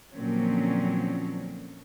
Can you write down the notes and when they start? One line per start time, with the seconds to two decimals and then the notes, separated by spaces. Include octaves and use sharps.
0.15 A#2 D3 F3 F#3 C4 C#4